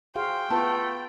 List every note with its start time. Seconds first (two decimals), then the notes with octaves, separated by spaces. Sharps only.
0.16 F#4 G#4 C5 F5 G5
0.50 A3 B3 F4 B4 A5